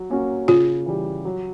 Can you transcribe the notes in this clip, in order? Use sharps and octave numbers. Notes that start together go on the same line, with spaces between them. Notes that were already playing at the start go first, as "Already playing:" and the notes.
Already playing: F#3
A#3 C#4 F#4
C#3 F4
E3 G3
F#3